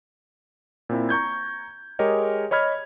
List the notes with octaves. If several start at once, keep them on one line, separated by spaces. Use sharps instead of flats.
A#2 C4 E4
A#5 C#6 G6 G#6
G#3 G4 G#4 A#4 C#5 D#5
C#5 D#5 B5 F6 G#6